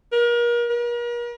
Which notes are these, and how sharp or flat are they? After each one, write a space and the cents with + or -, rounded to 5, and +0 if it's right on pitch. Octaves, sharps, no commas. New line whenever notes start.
A#4 +35
A#4 +40